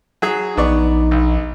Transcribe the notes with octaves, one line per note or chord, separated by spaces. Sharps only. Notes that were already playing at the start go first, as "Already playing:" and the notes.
F#3 G#4
A#1 B3 D#4 D5 C#6
B1